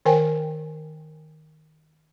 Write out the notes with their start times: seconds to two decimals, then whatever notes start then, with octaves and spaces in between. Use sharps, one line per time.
0.05 D#3 A#4 C5 G5 G#5